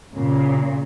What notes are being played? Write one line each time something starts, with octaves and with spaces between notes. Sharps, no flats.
A#2 C#3